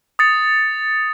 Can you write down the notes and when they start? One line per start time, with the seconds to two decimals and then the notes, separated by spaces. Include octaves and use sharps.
0.19 D#6 A6 C#7